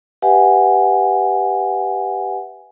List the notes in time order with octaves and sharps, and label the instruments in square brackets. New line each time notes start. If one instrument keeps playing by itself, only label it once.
[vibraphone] G4 B4 E5 F#5 G#5